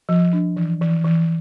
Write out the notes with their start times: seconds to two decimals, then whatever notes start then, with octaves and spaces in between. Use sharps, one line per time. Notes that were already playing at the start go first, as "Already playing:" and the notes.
0.09 F3
0.33 D4
0.56 E3
0.81 E3
1.04 E3